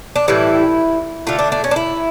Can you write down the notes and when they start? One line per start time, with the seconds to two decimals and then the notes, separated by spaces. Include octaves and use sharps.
0.16 D4
0.28 A2 E3 G3 E4
1.27 D3 A3 F4
1.39 D4
1.52 D4
1.64 C#4
1.71 D4
1.76 E4